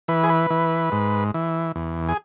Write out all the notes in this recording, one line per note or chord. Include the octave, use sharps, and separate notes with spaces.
E3 B4
G#4
B4
E3
G#2
E3
E2
G#4